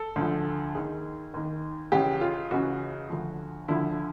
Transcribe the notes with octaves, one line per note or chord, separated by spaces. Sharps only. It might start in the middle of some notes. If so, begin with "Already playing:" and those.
Already playing: A4
D2 D3 F3
D#2 D#3 G#4
D#2 D#3
C#2 C#3 E3 G4
F4
C#2 C#3 E3 F#4
D2 D3 F3
D2 D3 F3 E4